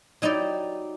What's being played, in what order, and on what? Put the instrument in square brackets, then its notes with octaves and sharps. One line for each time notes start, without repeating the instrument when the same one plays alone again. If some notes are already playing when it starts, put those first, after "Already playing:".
[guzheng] F#3 D#4 E4 G4 D5